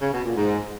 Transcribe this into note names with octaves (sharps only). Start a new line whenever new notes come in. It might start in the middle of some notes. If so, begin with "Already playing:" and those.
C#3
B2
A#2
G#2